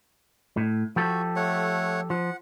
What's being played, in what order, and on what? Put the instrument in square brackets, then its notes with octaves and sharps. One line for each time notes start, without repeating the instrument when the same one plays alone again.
[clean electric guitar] A2
[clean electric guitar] F3 G4 A4 [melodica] F#4
[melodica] A3 C#5 F#5
[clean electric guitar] F3 [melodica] F#5